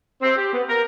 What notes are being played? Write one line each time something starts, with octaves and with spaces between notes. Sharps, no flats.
C4
G4
B3
A#4